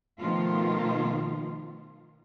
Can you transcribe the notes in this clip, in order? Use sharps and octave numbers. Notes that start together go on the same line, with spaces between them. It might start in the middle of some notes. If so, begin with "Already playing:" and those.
B2 D#3 F3 A3 F4